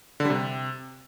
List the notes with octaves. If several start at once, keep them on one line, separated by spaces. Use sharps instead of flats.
D3
G3
C3